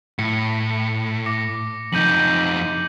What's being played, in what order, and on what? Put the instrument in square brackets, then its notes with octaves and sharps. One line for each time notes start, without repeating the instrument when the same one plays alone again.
[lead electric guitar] A2 [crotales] C#7
[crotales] D6 A#6 C#7
[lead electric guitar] F2 D#4 [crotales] G6 D#7 F#7